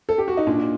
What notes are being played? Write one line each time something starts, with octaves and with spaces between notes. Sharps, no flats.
A4
G4
F#4
D#4
A#2 D4